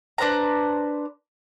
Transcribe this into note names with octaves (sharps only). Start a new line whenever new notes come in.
D4 B4 C5 A#5